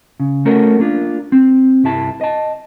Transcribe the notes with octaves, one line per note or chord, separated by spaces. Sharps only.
C#3
A3 C#4 F#4 A4 A#4
A#3 D4 F4
C4
C2 G2 E4 A5
D#5 A5